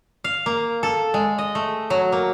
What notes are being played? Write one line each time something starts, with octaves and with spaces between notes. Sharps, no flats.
F5
A#3
A4
G#3
D#5
A3
F#3
A#3